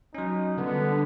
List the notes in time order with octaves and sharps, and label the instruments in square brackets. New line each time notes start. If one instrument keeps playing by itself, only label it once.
[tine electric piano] F#3 C#4 [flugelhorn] D#4
[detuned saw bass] D3 [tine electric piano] G3 [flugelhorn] B3